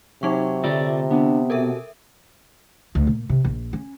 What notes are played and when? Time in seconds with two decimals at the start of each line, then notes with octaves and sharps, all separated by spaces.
0.23 C3 F#3 D#4 C#6
0.64 D3 A3 F4 D5
1.11 B3 D4
1.50 B2 A4 A#4 E5
2.95 D2
3.07 A#2
3.30 C3
3.45 A#1
3.73 C#4